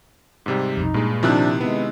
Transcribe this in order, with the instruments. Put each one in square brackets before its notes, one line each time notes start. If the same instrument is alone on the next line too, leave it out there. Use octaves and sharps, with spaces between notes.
[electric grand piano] G#2 C3 G3
[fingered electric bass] B1 F2 [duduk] D#4
[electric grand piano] G2 G#3 [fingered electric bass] A#2
[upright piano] C3 D#3 E4 [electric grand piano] F3 F#6 [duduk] D4
[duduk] G#3 [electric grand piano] B3